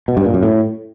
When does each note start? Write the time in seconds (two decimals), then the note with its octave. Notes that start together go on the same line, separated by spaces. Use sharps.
0.08 B2
0.17 G2
0.25 A#2
0.34 F#2
0.43 A2